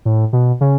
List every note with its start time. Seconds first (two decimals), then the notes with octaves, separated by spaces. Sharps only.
0.05 A2
0.33 B2
0.61 C#3